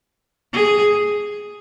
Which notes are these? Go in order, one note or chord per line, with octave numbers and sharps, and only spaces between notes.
G#4